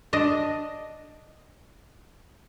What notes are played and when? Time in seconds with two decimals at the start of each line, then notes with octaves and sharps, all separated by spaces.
0.13 D4 D#5